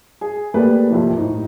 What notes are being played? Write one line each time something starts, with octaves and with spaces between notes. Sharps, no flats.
G#4
A3 A#3 G4 B4 D5
F2 C3 F3
A2 D#4